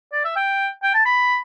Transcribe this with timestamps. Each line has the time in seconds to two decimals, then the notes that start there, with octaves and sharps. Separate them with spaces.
0.12 D5
0.25 E5
0.36 G5
0.83 G5
0.94 A5
1.05 B5